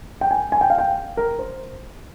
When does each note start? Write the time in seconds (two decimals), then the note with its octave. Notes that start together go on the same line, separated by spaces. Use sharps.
0.21 G5
0.31 G#5
0.52 G#5
0.61 G5
0.70 F5
0.78 G5
1.17 A#4
1.39 C5